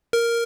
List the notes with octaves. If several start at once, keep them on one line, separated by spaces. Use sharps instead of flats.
A#4